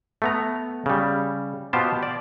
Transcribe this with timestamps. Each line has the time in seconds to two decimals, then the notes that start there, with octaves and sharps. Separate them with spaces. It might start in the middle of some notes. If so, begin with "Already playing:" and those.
0.22 A3 B3 A#5
0.86 C#3 G3
1.73 B2 B3 F4 G4 C5 A5
2.03 D5